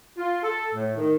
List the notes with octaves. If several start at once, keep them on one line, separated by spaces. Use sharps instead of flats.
F4
A4
A2
D#3